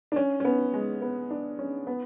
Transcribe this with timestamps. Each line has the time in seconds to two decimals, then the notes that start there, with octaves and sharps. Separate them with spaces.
0.12 D4
0.16 C#4
0.40 C#4
0.45 B3
0.73 G#3
1.02 B3
1.30 D4
1.59 C#4
1.87 B3